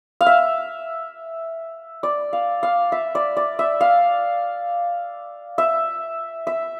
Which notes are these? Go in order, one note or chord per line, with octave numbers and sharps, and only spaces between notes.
F5
E5
D5
F5
F5
E5
D5
D5
E5
F5
E5
E5